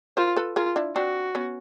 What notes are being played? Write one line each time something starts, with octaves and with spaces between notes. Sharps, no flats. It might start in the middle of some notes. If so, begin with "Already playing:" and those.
F4 A#4 C5
A4 B4
F4 G#4 A#4
D4 E4
C4 D4 F#4
B3 C#4